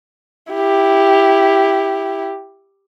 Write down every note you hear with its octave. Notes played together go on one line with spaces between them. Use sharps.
E4 G4